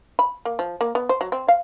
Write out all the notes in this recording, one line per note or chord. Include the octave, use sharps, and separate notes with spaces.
B5
A#3
F3
A#3
B3
C5
F#3
C4
F5